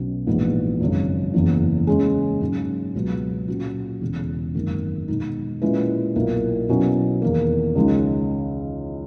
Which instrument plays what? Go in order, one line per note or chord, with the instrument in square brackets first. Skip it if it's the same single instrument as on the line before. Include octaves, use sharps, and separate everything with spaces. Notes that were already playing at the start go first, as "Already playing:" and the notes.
Already playing: [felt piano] B1 B2 F#3 C#4
A#1 G#2 E3 B3
G#1 F#2 C#3
F#1 E2 C#3 E3
C#3 G#3 C#4 G#4
G#2 F#3 C#4
C#2 B2 F#3 B3
A#2 F#3 C#4 F#4
E1 E2 C#3
G#1 F#2 D#3 A#3 D#4
B2 G#3 D#4
A#2 G#3 C#4 E4 B4
B1 A#2 A#3 E4
B2 F#3 C#4 E4
E2 D#3 A#3
C#2 C#3 G#3 D#4